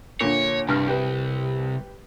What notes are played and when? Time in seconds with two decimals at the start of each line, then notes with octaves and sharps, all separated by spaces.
0.21 A#2 D3 C#5
0.69 C2 G2 F6
0.87 G4 B4